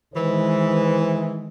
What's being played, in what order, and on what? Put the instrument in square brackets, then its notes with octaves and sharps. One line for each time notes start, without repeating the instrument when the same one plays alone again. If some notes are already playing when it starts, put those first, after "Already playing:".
[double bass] D#3 G#3 [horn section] E3 [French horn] C5